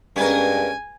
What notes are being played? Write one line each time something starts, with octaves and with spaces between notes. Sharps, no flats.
G2 G#3 B3 C#4 G#4 A#4 G#5